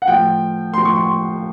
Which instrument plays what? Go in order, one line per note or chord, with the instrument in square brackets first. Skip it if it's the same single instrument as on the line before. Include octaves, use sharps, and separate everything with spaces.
[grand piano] F#5
A2 F3 G5
A2 F3 C6
C#6
C6